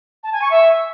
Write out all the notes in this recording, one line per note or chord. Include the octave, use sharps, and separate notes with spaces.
A5
G#5
C#6
E5